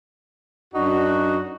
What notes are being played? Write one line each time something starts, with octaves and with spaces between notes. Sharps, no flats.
F#2 D4 D#4 F#4